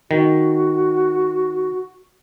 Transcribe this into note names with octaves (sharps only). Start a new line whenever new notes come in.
D#3 F#4